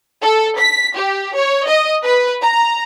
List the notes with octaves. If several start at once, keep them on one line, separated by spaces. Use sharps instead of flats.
A4
B6
G4
C#5
D#5
B4
A#5